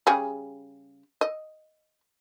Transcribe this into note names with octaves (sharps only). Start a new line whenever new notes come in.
C#3 G3 G#4
D#5